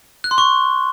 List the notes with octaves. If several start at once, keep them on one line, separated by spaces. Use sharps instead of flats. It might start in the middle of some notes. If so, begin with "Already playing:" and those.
F#6
C6
C#6